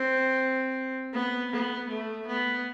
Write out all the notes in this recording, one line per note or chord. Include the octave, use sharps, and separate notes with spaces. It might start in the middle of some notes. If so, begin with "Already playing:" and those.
Already playing: C4
B3
B3
A3
B3